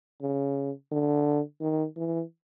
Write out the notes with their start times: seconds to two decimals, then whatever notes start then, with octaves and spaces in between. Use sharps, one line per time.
0.22 C#3
0.92 D3
1.61 D#3
1.97 E3